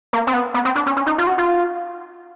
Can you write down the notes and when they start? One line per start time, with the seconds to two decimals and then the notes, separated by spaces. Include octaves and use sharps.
0.13 A#3
0.27 C4
0.33 B3
0.54 B3
0.65 C4
0.75 D4
0.86 C#4
0.97 C#4
1.06 D#4
1.18 F4
1.27 F#4
1.38 F4